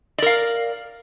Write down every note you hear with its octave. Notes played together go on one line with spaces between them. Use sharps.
A#4 D5 F5